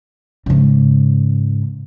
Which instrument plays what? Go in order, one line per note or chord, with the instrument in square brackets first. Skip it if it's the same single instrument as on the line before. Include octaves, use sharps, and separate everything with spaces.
[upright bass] G#2 C#3